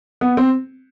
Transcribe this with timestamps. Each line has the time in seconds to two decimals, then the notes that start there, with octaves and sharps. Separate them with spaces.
0.21 B3
0.37 C4